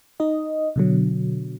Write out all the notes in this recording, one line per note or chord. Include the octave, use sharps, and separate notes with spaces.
D#4 D#5
B2 D3 F#3